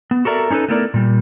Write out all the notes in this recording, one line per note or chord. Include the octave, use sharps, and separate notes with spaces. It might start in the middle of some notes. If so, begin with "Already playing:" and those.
B3
F#4 A4 A#4 D5 E5
C#4 D#4 G4 A4 B4
A3 B3 E4 A#4 C#5 D5
A#2 G3